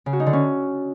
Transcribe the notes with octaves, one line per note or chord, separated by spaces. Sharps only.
C#3
F#4
D#4
D3
C#4